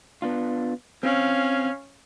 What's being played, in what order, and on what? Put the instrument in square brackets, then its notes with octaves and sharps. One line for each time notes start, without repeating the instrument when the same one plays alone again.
[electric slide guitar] B3 D4 F4
[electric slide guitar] C4 [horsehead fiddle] C#4 F5